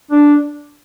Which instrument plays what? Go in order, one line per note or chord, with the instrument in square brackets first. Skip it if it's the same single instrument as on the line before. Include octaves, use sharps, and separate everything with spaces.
[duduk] D4